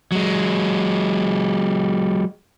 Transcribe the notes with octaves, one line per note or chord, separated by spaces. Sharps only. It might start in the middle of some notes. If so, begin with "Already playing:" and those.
F#3 G#3